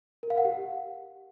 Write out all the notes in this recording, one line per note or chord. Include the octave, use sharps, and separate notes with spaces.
A#4
F5
F#5
G4